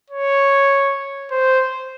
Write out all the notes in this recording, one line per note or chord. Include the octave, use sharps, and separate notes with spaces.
C#5
C5